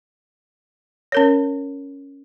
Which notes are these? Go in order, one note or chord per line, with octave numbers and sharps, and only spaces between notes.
C#4 A#4 C#5